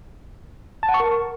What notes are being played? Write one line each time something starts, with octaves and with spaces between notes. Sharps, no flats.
A5
F#5
C#6
A#4